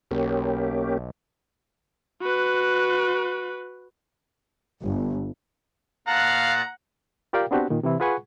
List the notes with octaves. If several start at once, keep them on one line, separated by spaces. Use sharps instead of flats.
B1 A#3 C#4 G4
F#4 B4
G1
A#2 F5 F#5 A5 A#5 F#6
F4 G4 A#4 D5 F5 G5
B3 C4 D4 F#4 G4
A#2 D#3
C3 E3 E4
F4 G#4 B4 F#5 G#5 C#6